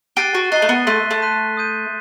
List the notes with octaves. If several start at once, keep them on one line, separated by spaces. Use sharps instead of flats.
G4 F#6 A6 C7 D#7 G7
F#4
D#4 F#6 A6 C7 D#7 G7
A3
B3
A3 C6 F#6 B6 D#7
A3
C6 F#6 B6 D#7
D#6 G6 D#7